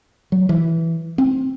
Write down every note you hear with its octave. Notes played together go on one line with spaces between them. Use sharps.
F#3
E3
C4